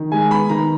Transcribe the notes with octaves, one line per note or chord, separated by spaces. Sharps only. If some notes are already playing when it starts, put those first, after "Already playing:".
Already playing: D#3
G#3 G#5
B3 B5
D#3 A#5